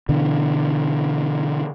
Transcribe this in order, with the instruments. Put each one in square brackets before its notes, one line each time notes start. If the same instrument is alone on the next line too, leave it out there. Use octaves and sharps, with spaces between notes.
[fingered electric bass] B2 D3 E3